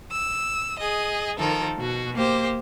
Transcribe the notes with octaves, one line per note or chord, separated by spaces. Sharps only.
E6
G#4 D#5
D#3 F3 A4 A#4
B2 F#4
A#3 G4 C5